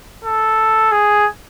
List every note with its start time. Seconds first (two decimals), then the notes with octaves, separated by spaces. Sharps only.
0.24 A4
0.92 G#4